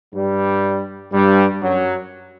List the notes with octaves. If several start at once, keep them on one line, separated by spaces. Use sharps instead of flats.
G2 G3
G2 G3
F#2 F#3